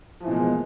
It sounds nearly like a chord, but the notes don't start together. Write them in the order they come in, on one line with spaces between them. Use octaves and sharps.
F3 E3 B2 G#3 A#3